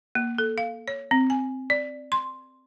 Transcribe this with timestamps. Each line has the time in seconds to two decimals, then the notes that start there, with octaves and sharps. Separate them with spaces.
0.15 A#3
0.38 A4
0.58 F5
0.88 C#5
1.11 C4
1.30 G#5
1.70 D5
2.12 C6